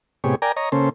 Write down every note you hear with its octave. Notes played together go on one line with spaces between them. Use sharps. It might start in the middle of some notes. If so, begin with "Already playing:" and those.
A2 C3 B3 G4 G#4 C#5
A#4 D5 G5 G#5 A#5
C#5 D#5 A#5
C#3 A#3 C#4 A4 C5